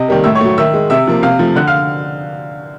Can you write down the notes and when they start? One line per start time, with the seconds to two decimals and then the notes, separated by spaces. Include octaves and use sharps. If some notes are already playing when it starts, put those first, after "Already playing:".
Already playing: C3 D#5
0.08 D#3 G3 A#3
0.24 A2 E5 E6
0.35 C#5 C#6
0.41 F#3 A3
0.58 D#3 E5 E6
0.74 G#3
0.90 C3 E5 E6
1.07 F3 A#3
1.23 C3 F5 F6
1.39 F3 A3
1.56 D3 F#5 F#6
1.67 F5 F6